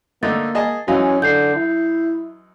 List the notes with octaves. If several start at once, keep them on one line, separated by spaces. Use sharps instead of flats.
D3 A3 A#3 D#4 A6
G#4 D#5 A5
F#2 E3 C#4 D#4 F#4 F5
D3 G6 C7
E4